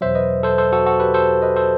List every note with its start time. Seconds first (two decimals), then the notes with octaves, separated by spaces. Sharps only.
0.01 E2 B2 F#3 C5 E5
0.15 B4 D#5
0.43 A4 C5
0.58 A4 C5
0.72 F#4 A4
0.86 F#4 A4
1.00 G4 B4
1.14 A4 C5
1.42 B4 D#5
1.56 A4 C5